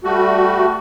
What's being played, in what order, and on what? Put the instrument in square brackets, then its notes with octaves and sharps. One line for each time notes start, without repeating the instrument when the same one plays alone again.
[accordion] G3 A3 F#4